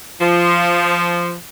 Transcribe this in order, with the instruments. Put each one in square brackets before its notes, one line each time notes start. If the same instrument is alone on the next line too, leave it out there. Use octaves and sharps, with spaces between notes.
[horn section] F3